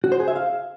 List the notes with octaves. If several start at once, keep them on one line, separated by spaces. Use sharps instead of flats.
F#4
C5
G#4
E5
F5